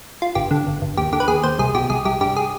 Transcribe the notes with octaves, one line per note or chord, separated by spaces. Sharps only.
F4
G1 G4
D3
G1
G1
D#2 G4
D3 G4
B4
D#2 G#4
D#2 C5
C2 G#4
B2 G4
C2 G#4
C2 G4
G2 G4
G#4